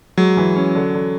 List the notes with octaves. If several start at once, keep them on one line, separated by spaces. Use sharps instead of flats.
F#3 G#3
E3
C#4
D3
D3